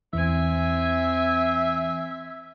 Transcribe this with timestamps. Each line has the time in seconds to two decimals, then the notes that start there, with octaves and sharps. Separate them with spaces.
0.13 E2 E3 C4 E5 G#5